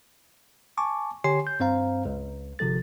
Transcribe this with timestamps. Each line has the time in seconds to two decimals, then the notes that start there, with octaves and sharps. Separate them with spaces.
0.77 G#5 A5 C#6 D6
1.24 D3 G4 C#5 G#5 C6 C7
1.47 G6
1.60 G2 C4 C5 F5 A#5
2.05 C#2
2.59 G1 C3 F3 A4 A6